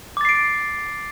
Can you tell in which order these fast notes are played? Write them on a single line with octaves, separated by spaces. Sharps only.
D6 A6 C7 D7